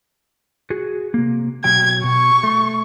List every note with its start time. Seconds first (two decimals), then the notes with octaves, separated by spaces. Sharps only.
0.70 F#4 G#4
1.14 C3 A#3
1.64 B2 F#3 G5 G#6
2.04 B2 C#6
2.43 A3